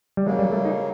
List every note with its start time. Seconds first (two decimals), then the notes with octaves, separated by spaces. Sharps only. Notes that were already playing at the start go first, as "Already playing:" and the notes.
0.17 G3
0.26 C#3 F#3 G#3 A#3
0.39 G3
0.52 A3
0.65 D#4